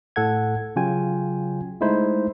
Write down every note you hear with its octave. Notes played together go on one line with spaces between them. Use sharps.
A2 A4 F#5 G#6
C#3 F#3 F4 G5 G#5
G#3 A3 D#4 E4 C5